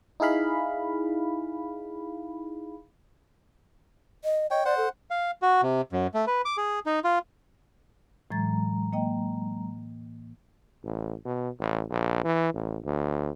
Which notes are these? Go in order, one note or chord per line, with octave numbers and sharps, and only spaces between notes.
D#4 E4 G#4 F5 B5
D#5
C#5 D#5 G5
C5 D5 F#5
A4
F5
F#4
C3
F#2
A3
B4
D6
G#4
D#4
F4
A2 E3 F#3 G#3 A#5 A6
A#3 D#5 G5
A1
B2
A1
A#1
E3
A1
D2